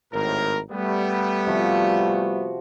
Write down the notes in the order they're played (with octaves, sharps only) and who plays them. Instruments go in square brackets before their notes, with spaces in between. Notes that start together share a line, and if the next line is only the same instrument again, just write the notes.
[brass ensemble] G#1 A2 A#4
G3 A3 B3
[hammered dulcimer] C3 F3 F#4